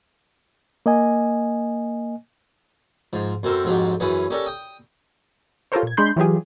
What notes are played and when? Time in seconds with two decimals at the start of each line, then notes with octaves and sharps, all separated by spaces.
0.86 A#3 D#5 G#5
3.13 G#2 F3
3.43 F#2 C4 A4 A#4 C5
3.65 F2 G#2 F3 F#3 G4
4.00 F#2 E3 C#4 G#4 B4
4.30 C#4 G4 A4 A#4 D5
4.46 G5 D#6
5.72 F4 G4 A4 A#4 C5 C#5
5.83 A#2 G#6
5.97 G#3 D4 B5 C6 G6
6.16 E3 F#3 F4 G4 G#4